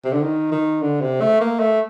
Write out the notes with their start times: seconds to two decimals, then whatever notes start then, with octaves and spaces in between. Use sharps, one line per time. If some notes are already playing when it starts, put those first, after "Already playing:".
0.04 C3
0.13 D3
0.23 D#3
0.52 D#3
0.82 D3
1.01 C3
1.21 A3
1.41 A#3
1.60 A3